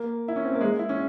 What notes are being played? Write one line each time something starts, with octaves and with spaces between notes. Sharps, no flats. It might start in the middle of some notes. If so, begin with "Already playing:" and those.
Already playing: A#3
E4
C#4
C4
A#3
G#3
E4
C#4